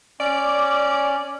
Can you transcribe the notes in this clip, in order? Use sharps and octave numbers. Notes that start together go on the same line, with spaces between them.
C#4 D5